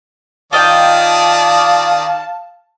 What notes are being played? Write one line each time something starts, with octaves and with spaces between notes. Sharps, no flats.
D#3 F4 D5 D#5 F5 G5 A5 D#6